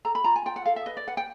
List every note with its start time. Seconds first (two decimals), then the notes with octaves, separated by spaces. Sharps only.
0.05 A4 A#5
0.15 B5
0.24 F4 A#5
0.36 G#5
0.46 F4 G5
0.56 F#5
0.65 A4 F5
0.76 E5
0.86 B4 D#5
0.97 D5
1.07 B4 F#5
1.17 G5